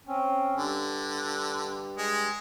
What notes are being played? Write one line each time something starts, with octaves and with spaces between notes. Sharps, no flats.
C4 C#4
G2 D3
G#3